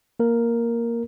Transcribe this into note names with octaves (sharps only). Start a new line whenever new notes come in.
A#3 A#4